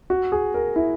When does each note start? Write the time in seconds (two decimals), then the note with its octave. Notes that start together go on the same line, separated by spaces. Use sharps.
0.10 F#4
0.32 G#4
0.54 A#4
0.76 E4